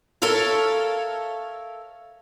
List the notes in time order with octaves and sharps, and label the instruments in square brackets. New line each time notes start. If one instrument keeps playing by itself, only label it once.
[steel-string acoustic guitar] A4 A#4 C#5 E5 F5 A5